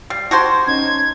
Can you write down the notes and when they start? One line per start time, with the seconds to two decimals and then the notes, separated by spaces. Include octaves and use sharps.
0.10 G3 C7
0.31 F#4 G4 C5 A5 G6 G#6
0.67 C#4 D#4 G#6